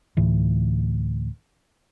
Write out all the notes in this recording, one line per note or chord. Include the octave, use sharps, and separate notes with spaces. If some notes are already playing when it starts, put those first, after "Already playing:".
D2 A2 E3